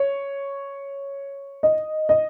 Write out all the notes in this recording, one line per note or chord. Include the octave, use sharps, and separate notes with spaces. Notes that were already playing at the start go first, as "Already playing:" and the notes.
Already playing: C#5
D#5
D#5